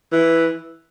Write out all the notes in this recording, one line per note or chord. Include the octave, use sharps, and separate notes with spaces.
E3